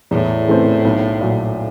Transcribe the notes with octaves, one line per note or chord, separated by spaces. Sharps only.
E2 A2
C#3 E3 A3 C4
B1
A#2 F#3